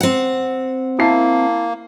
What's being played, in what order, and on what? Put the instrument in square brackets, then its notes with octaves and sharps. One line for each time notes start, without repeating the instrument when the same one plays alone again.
[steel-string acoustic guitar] C4 F#5
[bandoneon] A#3 [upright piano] E4 A5 C7